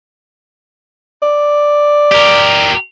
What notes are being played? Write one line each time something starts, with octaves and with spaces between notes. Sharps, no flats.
D5
G4 A#4